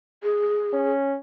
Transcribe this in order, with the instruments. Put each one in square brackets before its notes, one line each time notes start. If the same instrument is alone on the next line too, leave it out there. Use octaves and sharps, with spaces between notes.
[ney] G#4
[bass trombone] C#4